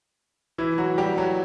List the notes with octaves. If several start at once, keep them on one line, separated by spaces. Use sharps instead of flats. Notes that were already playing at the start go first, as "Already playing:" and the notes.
E3 E4
F#3 F#4
G3 G4
F#3 F#4